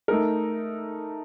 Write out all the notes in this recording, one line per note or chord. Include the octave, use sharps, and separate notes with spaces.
A3 D#4 A#4